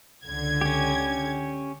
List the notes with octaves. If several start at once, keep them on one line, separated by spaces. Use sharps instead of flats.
C#2 D3 G#6
C#4 G4